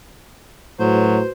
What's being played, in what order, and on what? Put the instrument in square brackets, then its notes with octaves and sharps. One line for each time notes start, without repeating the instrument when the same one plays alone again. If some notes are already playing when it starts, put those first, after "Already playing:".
[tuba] A2 [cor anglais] F#3 [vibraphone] F#4 B4 [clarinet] C5